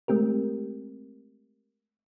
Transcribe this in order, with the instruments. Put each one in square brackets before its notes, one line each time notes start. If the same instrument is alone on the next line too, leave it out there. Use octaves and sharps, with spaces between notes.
[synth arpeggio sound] G#3 A3 C4 G4 A#4